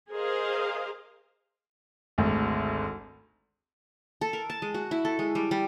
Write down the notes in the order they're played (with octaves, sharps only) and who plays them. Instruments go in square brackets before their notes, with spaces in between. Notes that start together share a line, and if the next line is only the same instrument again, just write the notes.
[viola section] G#4 A#4 C5 D#5 F5
[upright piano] G#1 D2
[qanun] A4
A#4
A5
G#3
F#4
E4
A4
G#3
G3
G3